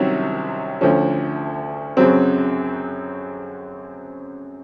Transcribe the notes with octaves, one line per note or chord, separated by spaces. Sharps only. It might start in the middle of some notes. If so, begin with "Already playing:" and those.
Already playing: C2 C3 D#3 F#3 C#4
D2 D3 F3 C#4
F#2 C#3 F#3 C4